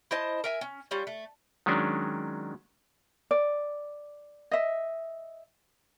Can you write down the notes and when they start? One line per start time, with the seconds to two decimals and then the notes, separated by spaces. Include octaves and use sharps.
0.11 E4 C5 D#5 A5
0.44 A#4 E5 G#5
0.61 C#4
0.91 G3 C#4 F4
1.07 A3
1.66 D#3 F#3 G#3 C#4 D4
3.31 D5
4.51 D#5 E5